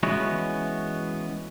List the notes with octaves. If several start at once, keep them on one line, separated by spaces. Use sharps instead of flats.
E3 G#3 B3 C#4 F#4